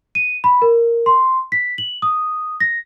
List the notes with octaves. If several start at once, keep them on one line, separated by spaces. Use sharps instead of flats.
D#7
B5
A#4
C6
B6
F#7
D#6
A#6